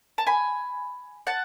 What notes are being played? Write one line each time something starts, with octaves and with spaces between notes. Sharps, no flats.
A5
G#5 B5
F#5 A5